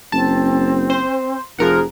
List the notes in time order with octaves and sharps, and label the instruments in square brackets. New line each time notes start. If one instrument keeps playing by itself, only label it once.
[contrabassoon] F#1 [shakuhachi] C4 [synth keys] A5
[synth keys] C5
[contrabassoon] F1 [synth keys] F3 A#4 F#5 [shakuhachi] G#4